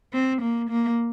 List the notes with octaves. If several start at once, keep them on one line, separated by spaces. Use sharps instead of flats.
C4
A#3
A#3